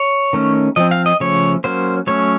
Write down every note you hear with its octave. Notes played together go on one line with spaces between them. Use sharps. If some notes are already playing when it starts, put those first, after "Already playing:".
Already playing: C#5
D#3 A3 C#4
F3 C4 D#5
F5
D#5
C#3 F3 A3 C#5
F#3 A#3 C#4 C5
F#3 A3 C#4 C#5